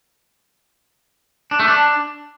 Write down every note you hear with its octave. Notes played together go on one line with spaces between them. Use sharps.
D4
A3
D4